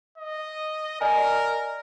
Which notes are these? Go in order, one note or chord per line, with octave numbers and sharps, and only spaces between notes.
D#5
A#4 D5 D#5 G#5